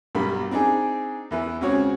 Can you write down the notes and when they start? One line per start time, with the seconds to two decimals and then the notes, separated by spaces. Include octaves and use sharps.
0.15 B1 G2 A#3 B5
0.51 C4 D4 D#4 G#4
1.31 E2 E3 B4
1.61 C#2 C#3 C4 F#4 C#5